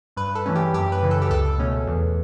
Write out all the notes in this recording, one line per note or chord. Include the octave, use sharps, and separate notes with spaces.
G2 B4
A4
E3 A3 C#4
G4
F#2 G4
B4
C#3 E3
A4
G4
C#2 A4
B2 A3 C#4
E2